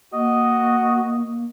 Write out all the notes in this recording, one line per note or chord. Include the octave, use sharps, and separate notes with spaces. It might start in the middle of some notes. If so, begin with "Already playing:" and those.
A#3 F#4 D#5